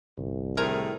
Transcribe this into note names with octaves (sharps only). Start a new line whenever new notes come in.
G1 C2
A2 D#3 G#4 A#4 C5 G#5 A#5